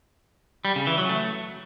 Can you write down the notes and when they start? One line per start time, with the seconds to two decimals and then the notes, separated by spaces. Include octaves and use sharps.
0.65 G3
0.76 C#3
0.87 E3
0.98 F#3
1.09 A3